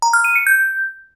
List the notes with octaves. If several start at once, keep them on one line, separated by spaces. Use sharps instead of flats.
A#5
F6
D#7
C#7
G6